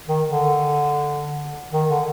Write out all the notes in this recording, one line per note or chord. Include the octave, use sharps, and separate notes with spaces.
D#3
D3
D#3
D3